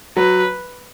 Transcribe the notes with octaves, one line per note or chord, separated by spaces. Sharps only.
F#3 B4